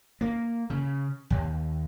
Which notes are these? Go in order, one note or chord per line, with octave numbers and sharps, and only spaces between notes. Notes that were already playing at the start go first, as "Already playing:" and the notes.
A#3
C#3
D#2